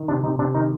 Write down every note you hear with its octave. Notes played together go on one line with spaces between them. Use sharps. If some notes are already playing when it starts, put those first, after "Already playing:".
Already playing: D#3
C3 D4
C3 D#4
C3 D4
D#3 D#4